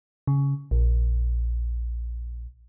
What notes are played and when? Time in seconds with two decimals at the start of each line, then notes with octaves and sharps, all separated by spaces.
0.27 C#3
0.71 A#1